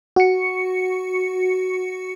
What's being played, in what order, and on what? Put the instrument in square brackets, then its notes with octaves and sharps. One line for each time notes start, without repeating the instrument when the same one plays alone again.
[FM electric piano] F#4 C#7